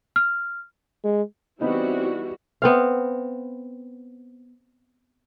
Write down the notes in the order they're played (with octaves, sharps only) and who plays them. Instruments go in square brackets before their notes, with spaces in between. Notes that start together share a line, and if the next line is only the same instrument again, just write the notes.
[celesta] F6
[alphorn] G#3
[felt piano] E3 B3 D#4 [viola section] G3 E4 F#4 [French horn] C4
[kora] B3 C4 F5